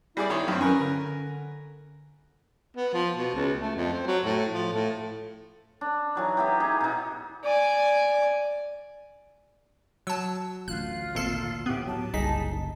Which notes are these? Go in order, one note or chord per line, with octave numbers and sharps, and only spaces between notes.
G3 E4 G#4 D5
D#3 C#5 C6
G2 F#3 C4
C#4 A#4 B4 G#5
D3
B3
F3
B2
C#2
A3
F2
C4
F#3
A2
F3
A2
D4
E3 F#3 D#4
B3 E4 G4
D#4 G#4
B2 D#4
D5 G#5
F#3 A5 E6
A1 D2 F4 F#6
G#1 A#2 A4 C7
A2 B3 G4
F#3 A5
F#1 C2 D#4 G#4 B6